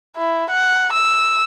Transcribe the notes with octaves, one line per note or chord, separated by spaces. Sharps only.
E4
F#5
E6